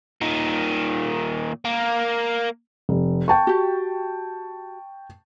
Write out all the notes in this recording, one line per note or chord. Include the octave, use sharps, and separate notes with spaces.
A#2 D#3
A#3
F1
G5 A5 C#6
F#4 G4